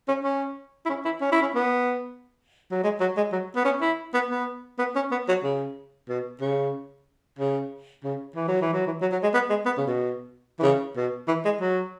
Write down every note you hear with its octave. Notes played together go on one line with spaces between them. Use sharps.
C#4
C#4
E4
C#4
E4
C#4
E4
C#4
B3
F#3
G#3
F#3
G#3
F#3
B3
C#4
E4
B3
B3
B3
C#4
B3
F#3
C#3
B2
C#3
C#3
C#3
E3
F#3
E3
F#3
E3
F#3
F#3
G#3
B3
G#3
B3
C#3
B2
E3
C#3
B2
E3
G#3
F#3